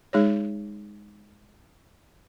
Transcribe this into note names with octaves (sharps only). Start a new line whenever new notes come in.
G#3 D#4 G#4 C#5